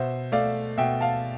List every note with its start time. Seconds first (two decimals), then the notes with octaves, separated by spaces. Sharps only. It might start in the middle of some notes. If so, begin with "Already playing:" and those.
Already playing: B2 C5 E5
0.32 A3 D5 F5
0.78 B2 E5 G5
1.01 F5 A5